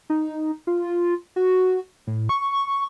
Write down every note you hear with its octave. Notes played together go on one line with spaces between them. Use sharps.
D#4
F4
F#4
A2
C#6